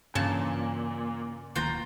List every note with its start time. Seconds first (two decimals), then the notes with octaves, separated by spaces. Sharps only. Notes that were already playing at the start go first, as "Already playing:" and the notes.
0.15 G2 A#2 C#3 E3 A5
1.56 D1 D#3 A#3 F4 G5 A#5